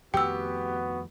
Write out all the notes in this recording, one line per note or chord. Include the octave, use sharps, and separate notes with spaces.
F2 D#3 A3 B3 F#4 G4 G5 E6